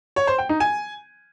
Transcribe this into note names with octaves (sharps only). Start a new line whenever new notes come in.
C#5
C5
G5
D#4
G#5